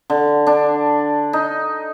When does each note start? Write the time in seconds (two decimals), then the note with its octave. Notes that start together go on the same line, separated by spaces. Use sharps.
0.10 D3
0.47 D4
1.33 D#4